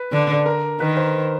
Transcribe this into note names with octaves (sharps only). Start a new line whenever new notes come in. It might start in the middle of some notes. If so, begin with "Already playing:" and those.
Already playing: B4
D3
A#4
D#3 B4
C5